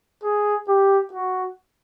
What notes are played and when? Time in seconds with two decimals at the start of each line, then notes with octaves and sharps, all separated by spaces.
0.24 G#4
0.68 G4
1.13 F#4